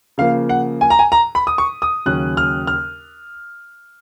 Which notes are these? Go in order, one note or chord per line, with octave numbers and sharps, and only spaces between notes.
C#3 F3 A#3 F5
F#5
G#5
A#5
G#5
A#5
B5
D#6
C#6
D#6
D#2 C#3 F#3 C#4 F#6
F6
F6